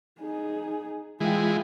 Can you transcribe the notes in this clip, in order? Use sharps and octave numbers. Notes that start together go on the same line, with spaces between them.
D#4 G#4
E3 G#3 F4 G5